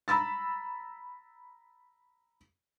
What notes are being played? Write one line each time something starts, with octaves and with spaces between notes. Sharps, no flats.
A#5 B5 E6 A6